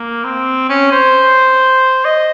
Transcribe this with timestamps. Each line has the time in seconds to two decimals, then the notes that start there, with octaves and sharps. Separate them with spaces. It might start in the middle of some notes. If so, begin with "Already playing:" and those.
Already playing: A#3
0.24 C4
0.69 C#4
0.92 C5
2.05 D#5